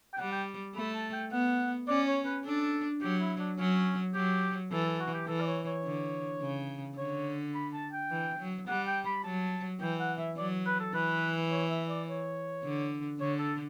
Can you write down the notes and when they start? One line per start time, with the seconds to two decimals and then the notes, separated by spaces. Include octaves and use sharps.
0.14 G5
0.19 G3 F#5
0.32 G5
0.75 A3 B5
0.94 A5
1.13 G5
1.31 B3 F#5
1.88 C#4 D5
2.07 C#5
2.26 B4
2.44 D4 A4
3.02 F#3 G4
3.20 E4
3.39 D4
3.58 F#3 C#4
4.14 F#3 G4
4.71 E3 A4
4.86 A4
5.00 F#4
5.14 G4
5.28 E3 A4
5.41 D5
5.47 C#5
5.66 C#5
5.85 D3
6.41 C#3
6.98 D3 C#5
7.55 B5
7.73 A5
7.92 G5
8.11 E3
8.39 F#3
8.68 G3 F#5
8.87 G5
9.06 B5
9.24 F#3 A5
9.81 E3 G5
10.00 F#5
10.19 E5
10.37 F#3 D5
10.66 B4
10.80 A4
10.94 E3 B4
11.51 C#5
11.70 E5
11.89 D5
12.08 C#5
12.64 D3
13.20 D3 C#5
13.39 A4